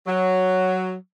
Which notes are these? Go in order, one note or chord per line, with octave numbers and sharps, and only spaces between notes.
F#3